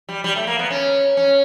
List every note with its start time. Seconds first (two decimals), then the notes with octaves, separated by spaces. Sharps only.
0.09 G3
0.24 G3
0.36 A3
0.47 A#3
0.59 B3
0.71 C#4
1.17 C#4